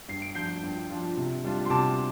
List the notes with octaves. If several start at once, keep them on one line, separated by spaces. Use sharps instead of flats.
G2 C7
D7
F3 D4 F4 G6 C7
G2
F3 D4 F4
C3
G3 D4 F4
C6
C3 A5 D6